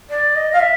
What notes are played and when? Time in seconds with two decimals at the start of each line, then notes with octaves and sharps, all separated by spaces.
0.10 D5
0.36 D#5
0.53 F5
0.60 E5